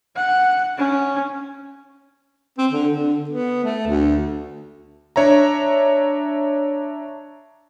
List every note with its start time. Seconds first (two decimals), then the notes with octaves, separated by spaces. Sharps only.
0.16 F#5
0.77 C#4
2.58 C4
2.71 D3
2.92 D3
3.30 B3
3.64 A3
3.88 D2
5.16 D4 C#5 E5 A#5